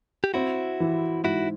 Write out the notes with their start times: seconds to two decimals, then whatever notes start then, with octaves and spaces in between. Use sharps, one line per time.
0.24 G4
0.34 C4 E4 F#4
0.80 E3
1.24 G#2 E4 F#4